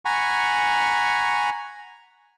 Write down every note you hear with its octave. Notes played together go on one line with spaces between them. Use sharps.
F#5 G#5 A#5 B5 C#6